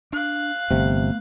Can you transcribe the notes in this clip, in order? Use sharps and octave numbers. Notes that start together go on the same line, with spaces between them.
D4 F5 F#6
G1 C3 A3 B3